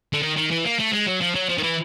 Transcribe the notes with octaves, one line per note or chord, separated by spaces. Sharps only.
D3
D#3
D#3
E3
A#3
A3
G#3
F#3
F3
F#3
F3
D#3
E3